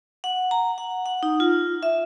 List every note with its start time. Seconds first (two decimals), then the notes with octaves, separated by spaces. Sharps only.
0.24 F#5
0.51 A#5
0.78 F#5
1.06 F#5
1.23 D#4
1.40 F4
1.83 E5